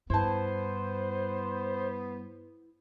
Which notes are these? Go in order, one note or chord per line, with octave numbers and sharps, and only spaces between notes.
G2 B3 E4 C5 A5